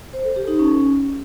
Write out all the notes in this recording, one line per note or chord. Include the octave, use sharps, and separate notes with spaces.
C5
A4
G4
D#4
C#4